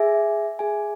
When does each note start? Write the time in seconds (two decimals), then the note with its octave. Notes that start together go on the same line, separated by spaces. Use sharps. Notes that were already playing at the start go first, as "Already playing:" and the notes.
Already playing: G#4 E5 G#5
0.59 G#4 E5 G#5